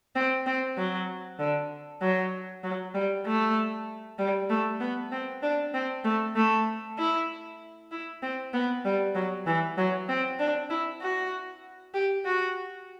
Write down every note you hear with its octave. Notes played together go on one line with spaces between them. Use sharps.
C4
C4
F#3
D3
F#3
F#3
G3
A3
G3
A3
B3
C4
D4
C4
A3
A3
E4
E4
C4
B3
G3
F#3
E3
F#3
C4
D4
E4
F#4
G4
F#4